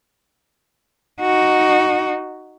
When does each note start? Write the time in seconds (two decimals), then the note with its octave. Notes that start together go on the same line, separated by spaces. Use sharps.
1.21 D#4 F#4